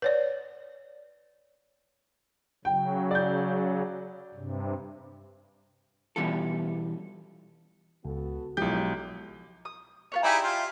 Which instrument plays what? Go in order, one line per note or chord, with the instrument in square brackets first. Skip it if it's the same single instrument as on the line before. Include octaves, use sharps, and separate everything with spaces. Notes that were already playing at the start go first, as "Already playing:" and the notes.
[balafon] B4 C#5 D5
[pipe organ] C#3 F#3 [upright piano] G5
[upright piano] D5 G6
[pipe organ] G2 C3
[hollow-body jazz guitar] B2 E3 G3 C#4 F4 A4
[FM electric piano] C#2 [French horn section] B3 F#4 A4
[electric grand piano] B1 G6 [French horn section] F#2 D#4 E4 [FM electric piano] F3 G#3 [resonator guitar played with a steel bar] G4
[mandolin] D#6
F4 B4 C#5
[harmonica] D#4 E4 G#4 [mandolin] G4 D5 E5
[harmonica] F4